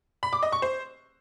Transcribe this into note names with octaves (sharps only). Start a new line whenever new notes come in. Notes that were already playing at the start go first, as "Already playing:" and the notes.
B5
D6
D#5
C#6
C5